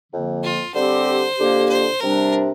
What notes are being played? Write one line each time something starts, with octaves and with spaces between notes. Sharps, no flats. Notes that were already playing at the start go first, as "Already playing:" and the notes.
F2 D3 F3 A#3
F4
D3 G3 C4 G4 C5
F2 D3 A#3 G4
C5
C3 G3 D4 A#4